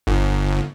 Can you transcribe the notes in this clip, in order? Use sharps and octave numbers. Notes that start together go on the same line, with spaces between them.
G1